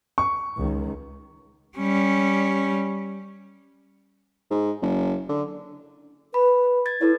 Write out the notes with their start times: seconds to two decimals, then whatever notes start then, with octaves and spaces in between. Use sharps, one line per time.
0.18 C#6
0.56 C#2 D#3
1.77 G3 C#4
4.51 G#2
4.82 F#1
5.29 D3
6.34 B4 B5
6.86 G#6 A6
7.01 E4 A4 B4 C#5